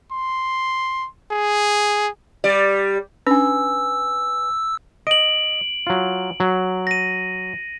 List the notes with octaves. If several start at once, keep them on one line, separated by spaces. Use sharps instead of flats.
C6
G#4
G3 D5
C#4 D4 B4 G#5 E6
D#5 D7 F#7
F#3 F4
F#3
A#6 D#7